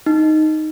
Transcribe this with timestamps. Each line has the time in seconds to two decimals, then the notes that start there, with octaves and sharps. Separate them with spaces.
0.06 D#4